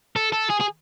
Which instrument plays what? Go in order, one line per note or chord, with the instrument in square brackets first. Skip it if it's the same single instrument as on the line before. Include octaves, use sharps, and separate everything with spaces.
[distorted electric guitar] A4
A4
G#4
G#4